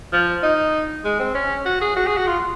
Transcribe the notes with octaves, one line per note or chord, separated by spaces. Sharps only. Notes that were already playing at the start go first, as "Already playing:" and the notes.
F3
D#4
G#3
C4
C#4
F#4
G#4
F#4
G#4
F#4
F4